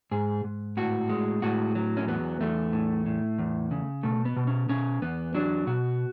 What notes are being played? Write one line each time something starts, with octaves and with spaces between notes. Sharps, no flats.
G#2 G#4
G#2
A2 F#4
G#3
A2 F#4
F#3
C#4
E2 B3
E2 A3
A2
A2
E2
C#3
B2 A3
B3
B2
C#4
B2 C#4
E2 B3
F#3 D4
B2 F#4